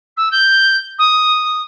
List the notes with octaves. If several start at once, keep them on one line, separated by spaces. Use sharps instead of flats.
E6
G6
D#6